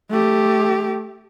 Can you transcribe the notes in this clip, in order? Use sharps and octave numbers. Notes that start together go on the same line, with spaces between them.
A3 G4